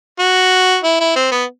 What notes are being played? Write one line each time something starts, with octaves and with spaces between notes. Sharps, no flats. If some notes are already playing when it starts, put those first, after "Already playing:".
F#4
E4
E4
C4
B3